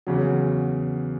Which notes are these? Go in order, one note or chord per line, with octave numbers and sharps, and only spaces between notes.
E2 C#3 F#3